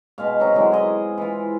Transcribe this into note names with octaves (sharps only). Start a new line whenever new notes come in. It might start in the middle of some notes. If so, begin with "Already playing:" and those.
B2 G#3 F5
F#3 C4 D#4
D3 E3 F#3 G#3
G#4 D#5
E3 F4